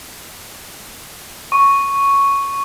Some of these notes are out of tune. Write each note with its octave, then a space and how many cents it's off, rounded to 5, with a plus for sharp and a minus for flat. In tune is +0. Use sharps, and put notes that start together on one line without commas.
C#6 +0